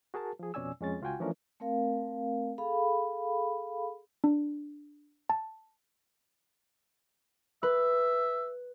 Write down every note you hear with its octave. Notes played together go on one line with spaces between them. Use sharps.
F#4 G#4 A#4 A5
F3 G#4
F2 B2 C#4 D5 G#5 E6
F2 G#3 C#4 A6
C#2 F4 F#4 G5 G#5
E3 F3 A3 C#4 D4 A#4
A3 C4 A#4 F5
G#4 A4 F5 B5
D4
A5
B4 E5